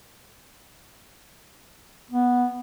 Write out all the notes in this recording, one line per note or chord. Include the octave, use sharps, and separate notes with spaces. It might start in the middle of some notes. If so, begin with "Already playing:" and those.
B3